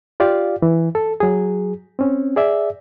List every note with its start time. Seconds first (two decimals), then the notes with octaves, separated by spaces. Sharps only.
0.20 F4 G4 D5 F5
0.62 E3
0.95 A4
1.20 F#3 G#4
1.99 C4 C#4
2.36 G#4 D5 E5